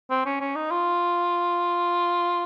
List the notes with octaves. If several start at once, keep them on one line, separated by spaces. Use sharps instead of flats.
C4
C#4
C#4
D#4
F4